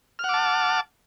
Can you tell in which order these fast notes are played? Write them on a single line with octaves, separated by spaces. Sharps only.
F6 F#5 D6 A5